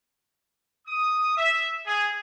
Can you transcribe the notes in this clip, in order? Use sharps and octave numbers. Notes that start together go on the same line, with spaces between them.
D#6
E5
G#4